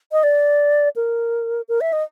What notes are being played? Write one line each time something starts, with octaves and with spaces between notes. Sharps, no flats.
D#5
D5
A#4
A#4
E5
D#5